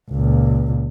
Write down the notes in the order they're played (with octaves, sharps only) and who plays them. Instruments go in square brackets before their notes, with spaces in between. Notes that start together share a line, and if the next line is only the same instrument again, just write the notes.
[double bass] C#2 A#2